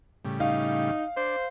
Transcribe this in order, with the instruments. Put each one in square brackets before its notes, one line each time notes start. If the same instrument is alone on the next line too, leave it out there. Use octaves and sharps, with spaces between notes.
[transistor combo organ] A2 C#3 G3
[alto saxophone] D#4 [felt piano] F5
[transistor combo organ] D4 [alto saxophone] C5